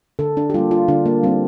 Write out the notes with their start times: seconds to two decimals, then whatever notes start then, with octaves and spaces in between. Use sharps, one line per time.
0.19 D3 A4
0.37 D4
0.50 G4
0.54 G3 A#3 F4
0.71 F4
0.88 D3 D4
1.06 A#3
1.23 G3 A#3 C4